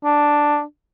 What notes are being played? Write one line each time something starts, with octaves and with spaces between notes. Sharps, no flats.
D4